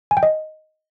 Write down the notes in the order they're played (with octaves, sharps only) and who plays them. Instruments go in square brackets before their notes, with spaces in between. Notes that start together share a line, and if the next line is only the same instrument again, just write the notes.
[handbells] G#5
G5
D#5